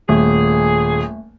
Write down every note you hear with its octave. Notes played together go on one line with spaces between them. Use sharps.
D#1 A3 G#4